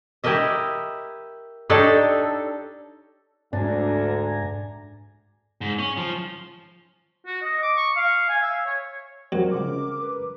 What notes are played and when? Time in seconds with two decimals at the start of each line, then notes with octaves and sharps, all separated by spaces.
0.24 E4 G4 A#4 D#5 E5
1.70 D4 D#4 G4 A4 C#5
3.53 D2 G#2 D4 G#5 A#5
5.61 G#2
5.78 C#4
5.97 F3
7.26 F#4
7.42 D#5
7.62 D6
7.77 C#6
7.96 F5
8.29 G#5
8.42 E5
8.66 C#5
9.32 F#3 G3 C4 A#4
9.51 C#3 F3 G#3 D6
10.01 B4